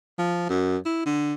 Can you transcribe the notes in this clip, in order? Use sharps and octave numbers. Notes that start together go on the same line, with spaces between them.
F3
F#2
E4
D3